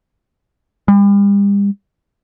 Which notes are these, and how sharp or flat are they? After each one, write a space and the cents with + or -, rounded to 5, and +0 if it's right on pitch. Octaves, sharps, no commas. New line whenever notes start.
G3 +40